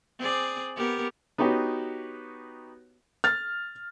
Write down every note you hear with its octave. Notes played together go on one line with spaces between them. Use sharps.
C4 G#4 D5
B3 G4 A#4
B3 D#4 F#4 G4 C#5
F6 A6